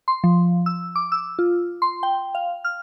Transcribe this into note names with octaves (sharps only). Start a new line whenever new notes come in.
C6
F3
E6
D6
E6
F4
C6
G5
F5
F6